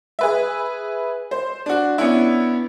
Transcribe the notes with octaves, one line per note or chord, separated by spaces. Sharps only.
G#4 B4 E5
C5
D4 F#4
B3 C#4 D4 E4